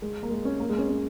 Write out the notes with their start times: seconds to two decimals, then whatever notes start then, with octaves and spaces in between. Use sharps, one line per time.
0.02 G#3
0.23 A#3
0.30 G#3
0.45 C#4
0.60 A#3
0.69 G#3
0.78 C#4
0.88 C#4